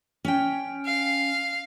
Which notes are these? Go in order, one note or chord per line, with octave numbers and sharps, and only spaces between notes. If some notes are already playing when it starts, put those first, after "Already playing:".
C#4 G5
F5